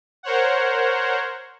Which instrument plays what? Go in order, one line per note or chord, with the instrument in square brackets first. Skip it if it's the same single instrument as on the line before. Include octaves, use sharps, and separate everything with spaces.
[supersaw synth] A#4 C5 C#5 F#5